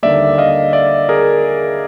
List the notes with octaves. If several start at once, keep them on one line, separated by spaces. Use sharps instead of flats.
D#2 D3 G3 A#3 D5 E5
D#5 F5
D5 E5
G#4 A#4